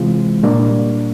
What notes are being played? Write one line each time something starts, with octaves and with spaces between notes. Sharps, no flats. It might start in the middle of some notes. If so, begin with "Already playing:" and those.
Already playing: C3 E3 G#3 C4 F4
A#2 G3 A#3 D4